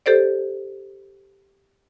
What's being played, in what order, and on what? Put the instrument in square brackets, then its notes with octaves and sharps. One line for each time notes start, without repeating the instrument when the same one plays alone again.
[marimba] G4 A4 C5 D5